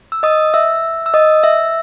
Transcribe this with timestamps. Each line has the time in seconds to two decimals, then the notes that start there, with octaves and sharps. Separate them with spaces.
0.12 E6
0.23 D#5 D#6
0.54 E5 E6
1.06 E6
1.14 D#5 D#6
1.43 E5 E6